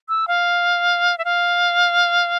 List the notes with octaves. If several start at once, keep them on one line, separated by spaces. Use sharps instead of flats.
E6
F5
E5
F5